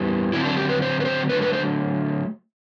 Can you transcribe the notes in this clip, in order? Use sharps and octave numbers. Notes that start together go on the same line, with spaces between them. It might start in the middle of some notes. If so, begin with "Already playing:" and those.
Already playing: E2 E3 G3
D3 F#3 C4 E4
D4
G4
B4
C5
B4
C5
D3 F#3 A3 B4
B4
C5